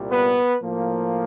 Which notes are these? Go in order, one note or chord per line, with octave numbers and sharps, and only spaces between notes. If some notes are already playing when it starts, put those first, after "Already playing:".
Already playing: C2 A#2 G3
B3 B4
A2 F3 A#3